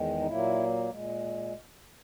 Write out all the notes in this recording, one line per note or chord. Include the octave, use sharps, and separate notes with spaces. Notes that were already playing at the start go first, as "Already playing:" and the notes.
Already playing: E2 D#3 G#3
D#4
A#2 F#3 A#3 E4
A#2 G#3